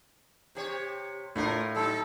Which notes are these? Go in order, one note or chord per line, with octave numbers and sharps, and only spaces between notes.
C3 G4 C#5
A2 D4 F4 A#4
F#3 D#4 A4